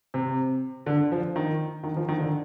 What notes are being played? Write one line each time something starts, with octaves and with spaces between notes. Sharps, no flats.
C3
D3
F3
D#3
D#3
F3
D#3
D3